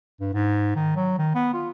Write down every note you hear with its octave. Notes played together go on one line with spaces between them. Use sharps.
G2
G#2
D#3
F#3
D#3
B3
F4